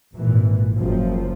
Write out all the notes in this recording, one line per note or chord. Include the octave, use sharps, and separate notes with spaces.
G#1 A#2 E3
F#1 F3